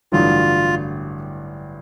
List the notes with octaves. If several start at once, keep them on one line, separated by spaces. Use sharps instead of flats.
A1 G2 D3 F#3 F4